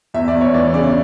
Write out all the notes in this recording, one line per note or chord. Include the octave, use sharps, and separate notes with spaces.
E2 E5
D5
E2
C#5
E3 D5
C#3 D5